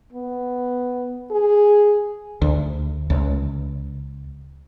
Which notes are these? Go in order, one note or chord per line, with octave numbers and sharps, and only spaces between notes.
B3
G#4
D2
C#2